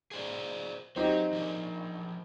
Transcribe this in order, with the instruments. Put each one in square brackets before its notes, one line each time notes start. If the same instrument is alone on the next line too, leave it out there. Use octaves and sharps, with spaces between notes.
[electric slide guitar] G#4 C5 D5
[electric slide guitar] F#3 [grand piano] C4 D#4 G4
[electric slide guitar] F3 D4